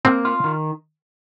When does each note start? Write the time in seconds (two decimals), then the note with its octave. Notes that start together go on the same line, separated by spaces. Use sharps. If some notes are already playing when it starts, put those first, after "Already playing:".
0.05 A#3 C4
0.25 F4
0.44 D#3